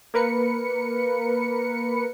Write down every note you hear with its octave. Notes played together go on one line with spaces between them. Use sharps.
A#3 A#4 B4 C#7